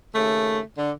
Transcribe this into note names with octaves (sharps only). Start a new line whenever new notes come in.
D#2 C#3 A3
D3